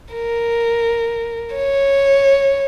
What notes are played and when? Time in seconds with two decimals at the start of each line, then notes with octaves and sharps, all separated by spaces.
0.14 A#4
1.56 C#5